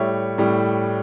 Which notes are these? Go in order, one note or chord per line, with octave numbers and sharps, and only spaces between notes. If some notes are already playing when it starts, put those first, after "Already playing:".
Already playing: A2 G3 C#5 E5
A2 G3